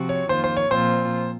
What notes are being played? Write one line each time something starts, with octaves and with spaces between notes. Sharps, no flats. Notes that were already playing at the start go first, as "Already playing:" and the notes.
Already playing: C3 F3 C4 F#4
C#5
F2 D#3 A#3 F4 C5
C5
C#5
A#2 F3 C4 F4 C5